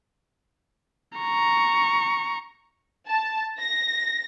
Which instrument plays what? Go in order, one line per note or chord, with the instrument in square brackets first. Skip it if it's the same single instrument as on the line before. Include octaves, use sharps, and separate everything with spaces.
[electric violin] A#5 C#6
[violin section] A5
A#6